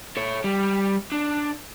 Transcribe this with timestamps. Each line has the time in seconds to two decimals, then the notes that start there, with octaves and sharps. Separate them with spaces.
0.17 A4 C#5
0.44 G3
1.12 D4